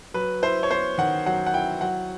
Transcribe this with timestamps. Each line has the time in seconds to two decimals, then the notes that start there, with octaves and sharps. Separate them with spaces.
0.14 F#3 B4
0.42 E4 C5
0.63 C#5
0.70 B3 C5
0.98 D#3 F#5
1.26 F#3 F#5
1.47 F#5
1.53 E4 G5
1.81 F#3 F#5